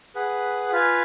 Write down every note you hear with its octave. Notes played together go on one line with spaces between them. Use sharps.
G#4 B4 F#5
F4 B4 F5 G#5